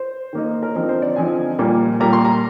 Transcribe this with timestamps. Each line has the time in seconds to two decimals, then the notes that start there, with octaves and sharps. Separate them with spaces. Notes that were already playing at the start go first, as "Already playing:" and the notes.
Already playing: C5
0.33 D#3 A#3 D#4
0.63 A#4
0.74 D3 F3 C4 D#4 C5
0.89 C5
1.02 D5
1.16 D3 F3 C4 D#4 G#5
1.59 A#2 G3 A#3
2.00 A#2 G3 A#3 A#5
2.13 C6
2.25 A#5